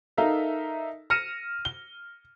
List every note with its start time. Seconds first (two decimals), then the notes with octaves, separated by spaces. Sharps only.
0.17 D#4 A4 A#4 E5 F5
1.10 F6 A#6 C#7 D#7 E7
1.65 G7